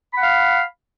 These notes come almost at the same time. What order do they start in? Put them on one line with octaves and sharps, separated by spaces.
B5 F#5 F5